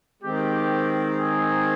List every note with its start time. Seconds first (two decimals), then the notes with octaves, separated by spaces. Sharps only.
0.22 D#3 G#3 C4 G4
1.15 G#4